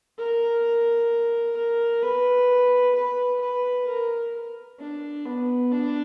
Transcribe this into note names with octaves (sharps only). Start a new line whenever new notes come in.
A#4
A#4
B4
B4
B4
A#4
D4
B3
D4